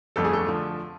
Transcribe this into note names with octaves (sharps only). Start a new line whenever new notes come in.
G1 F2 D3 F3 A3 A4
G#4
A4
D3 F3 A3